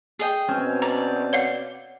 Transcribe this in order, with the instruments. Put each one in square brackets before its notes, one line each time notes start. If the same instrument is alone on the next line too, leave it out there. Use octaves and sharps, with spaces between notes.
[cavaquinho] G#4 D#5 G5
[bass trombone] B2 [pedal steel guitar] C4 C#4
[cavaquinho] D5 [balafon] A#5
[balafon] C#5 F5 F#5